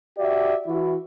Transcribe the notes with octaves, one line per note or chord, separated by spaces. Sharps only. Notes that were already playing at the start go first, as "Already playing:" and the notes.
F#4 G4 D5 E5
E3 E4 F#4